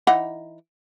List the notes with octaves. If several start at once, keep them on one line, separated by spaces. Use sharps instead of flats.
E3 D#4 F#5